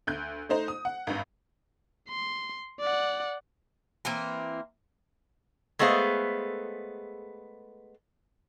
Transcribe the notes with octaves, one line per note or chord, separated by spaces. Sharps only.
D2 F#6 G6
A3 D#4 C5
D#6
F#5
G#1 G2
C6
D5 F#5
E3 A#3 C4 A#4
G#3 A3 B3 G#4 C5 F5